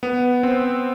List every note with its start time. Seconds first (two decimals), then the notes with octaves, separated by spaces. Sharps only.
0.03 B3
0.43 C4